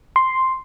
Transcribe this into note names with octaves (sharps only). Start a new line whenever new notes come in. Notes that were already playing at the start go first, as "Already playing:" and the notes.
C6